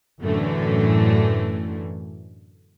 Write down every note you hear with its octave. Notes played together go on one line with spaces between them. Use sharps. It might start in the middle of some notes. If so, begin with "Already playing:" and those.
F#2 A2 D3 E3 A3